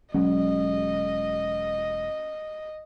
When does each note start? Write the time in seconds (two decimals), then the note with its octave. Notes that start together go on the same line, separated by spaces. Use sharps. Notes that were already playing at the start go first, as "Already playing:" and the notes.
0.14 E1 F#3 G#3 C#4 D#5